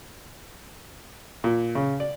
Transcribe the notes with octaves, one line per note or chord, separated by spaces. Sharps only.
A#2
C#3
D5